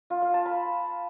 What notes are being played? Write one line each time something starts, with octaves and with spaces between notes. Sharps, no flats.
F4
F5
A5
B5